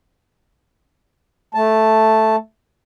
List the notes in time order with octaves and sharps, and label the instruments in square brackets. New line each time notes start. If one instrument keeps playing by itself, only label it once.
[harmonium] A3 A5